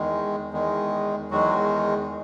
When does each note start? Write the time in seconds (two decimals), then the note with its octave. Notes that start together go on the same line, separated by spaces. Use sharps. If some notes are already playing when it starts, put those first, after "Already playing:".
Already playing: E2 D#3 G#3
0.52 E2 D#3 G#3
1.31 E2 D#3 F#3 G#3 F#4